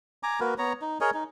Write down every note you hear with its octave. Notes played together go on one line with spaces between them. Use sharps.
G#5 A#5 D6
A#3 F#4 A#4 B4
B3 C#5 A#5
D#4
G#4 A#4 C#5 D#5
D#4